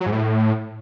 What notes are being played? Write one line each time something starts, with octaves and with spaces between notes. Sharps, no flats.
F#3
G#2
A2